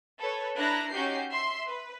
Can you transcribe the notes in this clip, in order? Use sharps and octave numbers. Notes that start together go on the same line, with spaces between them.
A4 B4 C#5
D4 E4 B4 A#5 F#6
C#4 D#4 F#4 G4 G6 C7
E5 C6
B4